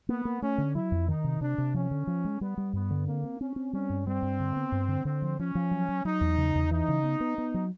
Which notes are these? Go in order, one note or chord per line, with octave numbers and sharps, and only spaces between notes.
A#3 B3
A#3
A3 C#4
D3
F#3 E4
F2
D#3 D#4
C3
C3 D4
C3
F3 C#4
D3
F3
G#3
G3 B3
G3
G2 B3
D3
A#3 C4
C4
C4 C#4
C4
G3 C#4
G2
G3 C4
G2
D3
B3
G2
D3
D3 C4
F3
F3 C#4
F3
F#3
F#3
F#3 D#4
E2
C#3
E2
E3 D#4
C#3
B3
B3
B3
F#3